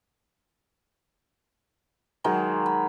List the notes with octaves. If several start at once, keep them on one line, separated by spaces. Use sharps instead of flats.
D#3 F#3 G#3
B5